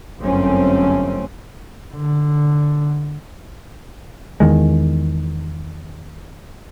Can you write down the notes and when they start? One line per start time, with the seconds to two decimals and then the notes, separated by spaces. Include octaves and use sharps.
0.20 G1 F#2 A3 C4 C#4
1.95 D3
4.40 E2 D#3 G#3